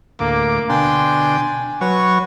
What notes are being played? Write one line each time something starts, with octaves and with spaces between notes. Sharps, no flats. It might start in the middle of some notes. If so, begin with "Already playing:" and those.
D2 A2 A#3 D6
B2 D3 D4 G5 G#5 C6
F#3 B4 C#5 F#5 C#6